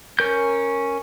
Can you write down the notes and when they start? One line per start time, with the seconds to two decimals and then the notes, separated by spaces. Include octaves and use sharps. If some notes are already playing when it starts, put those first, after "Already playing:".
0.19 C#4 A#4 G6